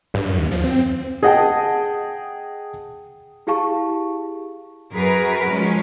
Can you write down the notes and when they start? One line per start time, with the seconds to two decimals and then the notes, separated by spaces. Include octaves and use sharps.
0.14 G2
0.25 F#2
0.38 D#2
0.51 F3
0.64 C4
1.23 G#4 D#5 F#5 G5 A5
3.47 E4 G4 G#4 F5 A5 C#6
4.94 F#2 G#4 A#4 B4
5.51 F3 G#3 C#4